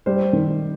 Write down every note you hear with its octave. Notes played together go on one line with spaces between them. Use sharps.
G3 C5
D#3